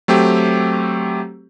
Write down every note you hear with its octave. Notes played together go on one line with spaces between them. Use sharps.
F#3 A3 C4 G4